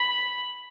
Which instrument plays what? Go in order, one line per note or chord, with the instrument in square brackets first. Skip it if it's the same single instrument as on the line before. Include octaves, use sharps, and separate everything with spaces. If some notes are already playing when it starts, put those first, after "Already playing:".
Already playing: [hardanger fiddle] B5